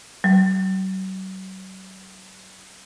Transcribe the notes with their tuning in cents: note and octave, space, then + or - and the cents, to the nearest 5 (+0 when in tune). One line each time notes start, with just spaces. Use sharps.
F#3 +40